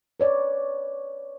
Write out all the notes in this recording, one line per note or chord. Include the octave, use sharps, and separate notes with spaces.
B4 C#5 D5